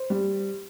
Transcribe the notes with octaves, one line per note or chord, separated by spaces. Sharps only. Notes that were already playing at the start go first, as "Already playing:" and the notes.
Already playing: C5
G3